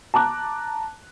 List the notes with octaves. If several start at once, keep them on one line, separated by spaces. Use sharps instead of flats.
A5 A#5 D6 F#6